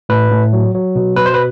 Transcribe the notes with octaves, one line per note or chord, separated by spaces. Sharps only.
A2 B4
A2
F#3
F#3
B2
B2 B4
C5
B4